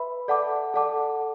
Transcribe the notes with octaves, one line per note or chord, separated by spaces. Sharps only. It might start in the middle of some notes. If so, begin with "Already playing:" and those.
Already playing: B4 E5 B5
A4 D5 F#5 A5 D6
A4 D5 F#5 A5 D6